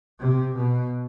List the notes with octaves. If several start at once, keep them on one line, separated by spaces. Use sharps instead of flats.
C3
B2